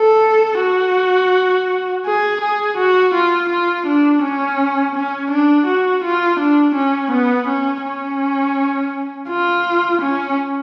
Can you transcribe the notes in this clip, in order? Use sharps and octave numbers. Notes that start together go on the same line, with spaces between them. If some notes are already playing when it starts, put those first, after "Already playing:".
Already playing: A4
F#4
G#4
G#4
F#4
F4
F4
D4
C#4
C#4
D4
F#4
F4
D4
C#4
B3
C#4
C#4
F4
C#4